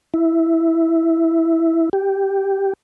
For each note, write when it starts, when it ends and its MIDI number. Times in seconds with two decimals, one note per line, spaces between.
0.14 1.89 64
1.93 2.73 67